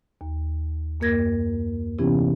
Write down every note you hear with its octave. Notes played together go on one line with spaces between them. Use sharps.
D#2
F#2 A#3 A#4 G#6 A#6
C3 E3 B3 C#4 E4 G4